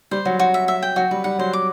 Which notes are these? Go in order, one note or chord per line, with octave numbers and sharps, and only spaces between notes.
G3 C5
F#3 F#4
F#3 F#4
E5
E5
G5
F#3 F#4
G3 B4
G3 F#5
F#3 C5
D6